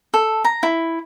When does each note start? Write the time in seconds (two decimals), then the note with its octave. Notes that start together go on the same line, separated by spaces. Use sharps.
0.14 A4
0.44 A#5
0.63 E4